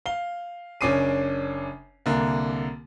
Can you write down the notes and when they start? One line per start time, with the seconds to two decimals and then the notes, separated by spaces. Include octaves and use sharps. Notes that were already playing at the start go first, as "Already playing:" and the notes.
0.06 F5 G7
0.81 F#1 C#4 D4 D6 C7 D#7
2.06 C2 D3 A#3